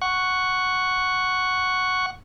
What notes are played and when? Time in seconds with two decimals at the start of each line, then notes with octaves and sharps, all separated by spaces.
0.01 F#5 C#6